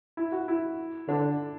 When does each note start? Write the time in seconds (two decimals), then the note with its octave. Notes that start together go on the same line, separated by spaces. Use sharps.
0.17 E4
0.32 F#4
0.48 E4
1.08 D3 D4